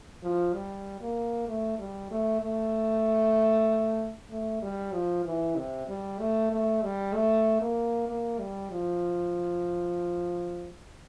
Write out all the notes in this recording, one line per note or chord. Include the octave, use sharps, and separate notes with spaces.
F3
G3
A#3
A3
G3
A3
A3
A3
G3
F3
E3
C3
G3
A3
A3
G3
A3
A#3
A#3
G3
F3